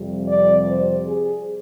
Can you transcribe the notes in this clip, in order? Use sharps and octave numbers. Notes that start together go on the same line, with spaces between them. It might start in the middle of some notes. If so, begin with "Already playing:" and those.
Already playing: F2 C3 G3
D5
C5
G#4